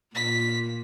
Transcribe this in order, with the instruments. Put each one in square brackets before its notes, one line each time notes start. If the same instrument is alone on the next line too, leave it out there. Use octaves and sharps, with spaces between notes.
[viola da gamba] A#2 [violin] B6